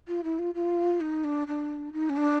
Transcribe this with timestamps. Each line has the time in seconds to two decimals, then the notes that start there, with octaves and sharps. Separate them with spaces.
0.08 F4
0.23 E4
0.39 F4
0.54 F4
1.00 D#4
1.24 D4
1.47 D4
1.93 D#4
2.09 C#4
2.16 D4